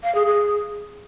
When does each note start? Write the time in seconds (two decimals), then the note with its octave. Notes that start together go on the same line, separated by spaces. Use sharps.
0.03 F5
0.15 G#4
0.26 G#4